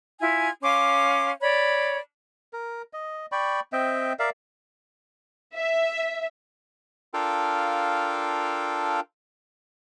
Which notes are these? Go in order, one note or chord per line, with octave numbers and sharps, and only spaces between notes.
E4 F4 G#5
C#4 F5 C6 D6
C#5 D5 B5
A#4
D#5
D5 G5 B5 C#6
C4 D#5 E5 G5
A#4 D5 E5 F5
E5
D4 F4 A4 A#4 F5 G5